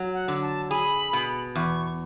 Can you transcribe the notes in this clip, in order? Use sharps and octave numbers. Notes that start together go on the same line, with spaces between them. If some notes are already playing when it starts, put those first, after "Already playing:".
Already playing: F#3
F#5
D3
A5
G#4 B5
B2
E2 C#6